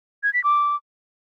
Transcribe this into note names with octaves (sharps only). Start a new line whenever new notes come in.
G#6
B6
D6